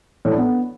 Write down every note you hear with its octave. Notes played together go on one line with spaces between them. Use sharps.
A2
D4
B3